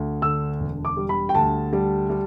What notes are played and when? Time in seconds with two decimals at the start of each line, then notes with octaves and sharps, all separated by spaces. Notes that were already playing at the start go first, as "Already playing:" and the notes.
Already playing: D2
0.22 D3 E6
0.60 E1
0.85 D6
0.97 G3
1.09 B5
1.29 G5
1.35 D2 A5
1.73 G3
2.10 G3